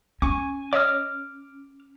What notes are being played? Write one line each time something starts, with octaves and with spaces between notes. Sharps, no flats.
C#4 G#5 C#6
C#5 D#5 D6 D#6 F6